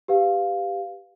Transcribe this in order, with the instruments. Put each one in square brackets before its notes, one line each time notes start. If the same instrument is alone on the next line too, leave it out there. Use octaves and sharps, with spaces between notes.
[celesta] G4 B4 F5